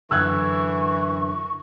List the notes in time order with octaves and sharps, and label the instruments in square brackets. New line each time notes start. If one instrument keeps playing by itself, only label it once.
[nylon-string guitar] F#2 D3 [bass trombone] E3 [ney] C#6 [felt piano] E6 F#6 G#6